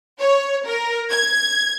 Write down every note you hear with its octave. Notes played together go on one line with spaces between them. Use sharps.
C#5
A#4
G#6